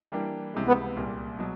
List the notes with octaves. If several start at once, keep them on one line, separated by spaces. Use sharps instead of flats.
E3 G3 A#3 D4 G4
C#2 C3 E3 G#3
B3
C2 A#2 G3
B2 F#3